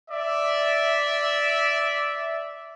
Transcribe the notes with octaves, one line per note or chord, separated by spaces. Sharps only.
D5 E5